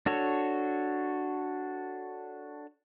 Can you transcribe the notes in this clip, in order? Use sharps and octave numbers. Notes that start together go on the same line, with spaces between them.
D4 F#4 A4 C#5